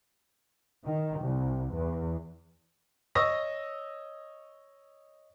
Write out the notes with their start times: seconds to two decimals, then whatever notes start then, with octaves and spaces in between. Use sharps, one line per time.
0.87 D#3
1.22 C2
1.75 E2
3.15 C#5 D#5 C#6 D#6 E6 A#6